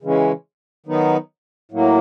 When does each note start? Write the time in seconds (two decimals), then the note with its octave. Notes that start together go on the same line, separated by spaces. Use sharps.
0.02 C#3 E3 G#3 C#4
0.86 D#3 F#3 B3 D#4
1.71 A2 F#3 A#3